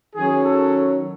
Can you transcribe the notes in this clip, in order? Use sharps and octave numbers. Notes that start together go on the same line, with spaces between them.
D#3 F#3 C#4 G#4
A4